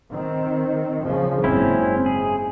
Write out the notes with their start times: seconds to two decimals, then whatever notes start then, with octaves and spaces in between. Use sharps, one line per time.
0.13 D#3 C4
1.03 C#3 F3
1.44 F#1 G#2 C4 C#4 E4
2.06 G#4